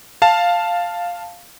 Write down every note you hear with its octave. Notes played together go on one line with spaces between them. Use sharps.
F5 A5